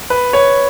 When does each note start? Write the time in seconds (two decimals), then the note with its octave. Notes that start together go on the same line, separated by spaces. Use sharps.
0.10 B4
0.33 C#5